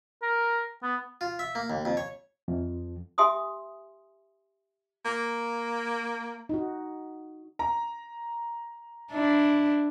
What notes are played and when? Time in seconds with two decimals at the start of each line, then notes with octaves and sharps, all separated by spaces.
0.22 A#4
0.83 B3
1.21 F4
1.39 E5
1.55 A#3
1.70 D#2
1.85 F2
1.97 C#5
2.48 F2
3.18 G4 E5 G#5 C6 D#6
5.05 A#3
6.49 D#4 F#4
7.59 A#5
9.12 D4 E4